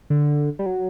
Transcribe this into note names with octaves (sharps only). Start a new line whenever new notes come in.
D3
G3
F#3